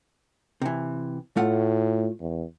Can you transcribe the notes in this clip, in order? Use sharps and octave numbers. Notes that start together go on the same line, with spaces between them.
C3 E3
A2 A3 F4 F#5
E2